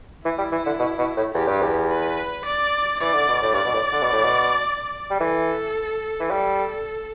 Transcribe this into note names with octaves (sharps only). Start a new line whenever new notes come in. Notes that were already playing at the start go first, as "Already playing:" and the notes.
E3 E4
G3
E3
D3
B2
B2
A2
E2 G4
G2
E2
B4
D5
E3 D5
D3
B2
A2
G2 D5
B2
A2
D3
B2
A2
B2
G3
E3 A4
E3
G3 A4